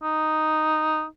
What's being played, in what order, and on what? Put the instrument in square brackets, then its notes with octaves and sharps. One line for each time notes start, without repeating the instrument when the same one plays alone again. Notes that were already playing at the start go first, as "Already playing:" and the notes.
[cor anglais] D#4